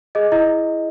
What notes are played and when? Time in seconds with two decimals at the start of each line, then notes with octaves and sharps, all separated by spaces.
0.15 G#4 D#5
0.32 E4 D#5